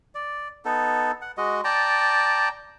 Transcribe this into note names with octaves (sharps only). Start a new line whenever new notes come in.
D5
B3 D#4 A4
F#5
G#3 F#4 D#5
D5 G5 A5 A#5